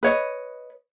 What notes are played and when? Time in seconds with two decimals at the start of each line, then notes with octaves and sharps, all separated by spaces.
0.03 B4 C#5 D#5